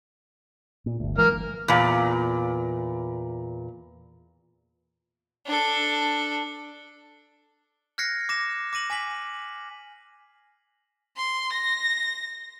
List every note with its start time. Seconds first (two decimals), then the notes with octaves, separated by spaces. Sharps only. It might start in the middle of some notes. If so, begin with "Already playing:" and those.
0.86 A#2
1.00 G1 D2
1.18 E3 F#3 G#3 A#3 F6
1.68 E2 A#2
5.46 D4 A4
7.98 F6 F#6 G#6 A#6 C7 C#7
8.29 D6 A#6 E7
8.73 D6 A#6 D#7 F#7
8.90 G#5 D6 B6 F#7
11.17 C6
11.53 A#6